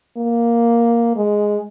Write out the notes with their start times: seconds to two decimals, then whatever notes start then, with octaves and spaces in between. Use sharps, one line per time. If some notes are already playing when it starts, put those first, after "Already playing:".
0.17 A#3
1.16 G#3